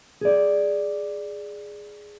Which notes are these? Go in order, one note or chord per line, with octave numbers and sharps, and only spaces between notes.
G#4 D5